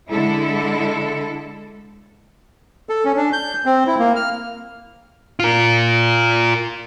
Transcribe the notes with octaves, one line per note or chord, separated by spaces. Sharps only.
D3 G#3 E4 A4
A4
C#4
D4
G6
C4
E4
A#3
F6
F4 A#4